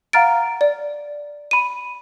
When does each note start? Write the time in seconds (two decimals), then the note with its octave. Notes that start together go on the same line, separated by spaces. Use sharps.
0.13 F5 F#5 A#5 F6 A6 D7
0.61 D5
1.51 B5 D#7